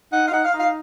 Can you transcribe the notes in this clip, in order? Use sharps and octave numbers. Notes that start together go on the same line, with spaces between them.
D#4 F#5
F5
D#4 F#5
F5
D#4
F5